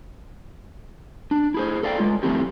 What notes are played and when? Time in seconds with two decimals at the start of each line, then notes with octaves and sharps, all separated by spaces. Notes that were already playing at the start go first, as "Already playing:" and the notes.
1.31 D4
1.54 E4 G#4 C5
1.83 A4 D5 F5 G5
1.99 G#3 F4
2.23 F3 A3 C4 E4 G4